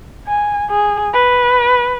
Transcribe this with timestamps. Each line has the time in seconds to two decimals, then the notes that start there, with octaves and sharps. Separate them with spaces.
0.27 G#5
0.70 G#4
1.13 B4